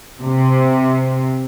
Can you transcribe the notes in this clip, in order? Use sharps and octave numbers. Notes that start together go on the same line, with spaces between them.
C3